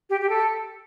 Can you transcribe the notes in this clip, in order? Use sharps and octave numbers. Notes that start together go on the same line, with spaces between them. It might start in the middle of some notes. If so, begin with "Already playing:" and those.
G4
G4
A4